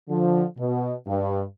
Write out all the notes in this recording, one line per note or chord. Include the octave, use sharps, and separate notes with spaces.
D3 F3
B2
G2